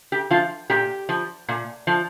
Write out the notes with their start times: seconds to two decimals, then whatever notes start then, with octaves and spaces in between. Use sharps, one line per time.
0.12 G4
0.30 F3 F4
0.70 A#2 G4
1.09 F3
1.49 A#2
1.87 F3